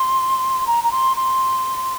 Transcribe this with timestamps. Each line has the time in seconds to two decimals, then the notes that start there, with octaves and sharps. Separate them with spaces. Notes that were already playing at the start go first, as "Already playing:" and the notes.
Already playing: C6
0.67 A#5
0.84 A#5
0.92 C6
1.17 C6